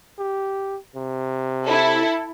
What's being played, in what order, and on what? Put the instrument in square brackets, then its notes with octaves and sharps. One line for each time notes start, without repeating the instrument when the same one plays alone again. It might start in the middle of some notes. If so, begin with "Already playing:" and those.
[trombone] G4
C3
[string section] E4 A4